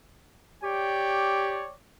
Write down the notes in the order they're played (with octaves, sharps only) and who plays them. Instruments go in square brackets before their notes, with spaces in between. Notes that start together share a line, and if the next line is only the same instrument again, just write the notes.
[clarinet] G4 [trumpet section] C#5 D5 G5